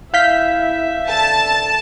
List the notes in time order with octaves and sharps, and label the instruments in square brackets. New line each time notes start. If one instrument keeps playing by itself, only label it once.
[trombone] E4 [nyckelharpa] E5 [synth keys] F5 G6 B6
[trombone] D3 [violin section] A5